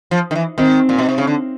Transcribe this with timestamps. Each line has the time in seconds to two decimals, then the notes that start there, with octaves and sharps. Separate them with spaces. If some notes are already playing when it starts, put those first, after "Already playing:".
0.11 F3
0.31 D#3
0.36 E3
0.58 D#3 C4
0.89 A#2
0.98 B2
1.09 C3
1.18 C#3
1.27 D3